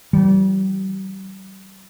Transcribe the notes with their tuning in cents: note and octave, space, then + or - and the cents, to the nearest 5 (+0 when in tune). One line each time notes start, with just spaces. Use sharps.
E3 +20 G3 -35